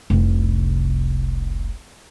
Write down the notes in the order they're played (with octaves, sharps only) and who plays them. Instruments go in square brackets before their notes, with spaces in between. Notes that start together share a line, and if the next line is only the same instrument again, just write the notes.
[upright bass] F1 C2